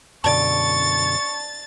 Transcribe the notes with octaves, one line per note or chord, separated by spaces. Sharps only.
F#2 B2 D3 D5 A5 C#6 A6